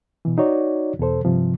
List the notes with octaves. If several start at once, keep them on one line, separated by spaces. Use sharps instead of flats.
B2 E3
D#4 F#4 C#5 D5
E2 B2 A4 C5
G2 C3 F3